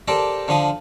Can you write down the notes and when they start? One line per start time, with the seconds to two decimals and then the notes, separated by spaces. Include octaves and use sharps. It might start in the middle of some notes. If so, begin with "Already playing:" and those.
0.08 G4 A4 A#4 C5 D5
0.48 D3 F3 F5 D#6